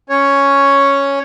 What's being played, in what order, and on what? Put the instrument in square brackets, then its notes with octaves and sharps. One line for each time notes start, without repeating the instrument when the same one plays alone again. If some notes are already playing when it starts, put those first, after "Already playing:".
[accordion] C#4 C#5